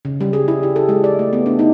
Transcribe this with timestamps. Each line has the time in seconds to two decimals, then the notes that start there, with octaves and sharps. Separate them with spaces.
0.05 C#3
0.21 G3
0.33 G#4
0.48 E4
0.63 G4
0.76 A4
0.89 G#3
1.04 D5
1.19 A3
1.33 B3
1.46 D4
1.59 D#4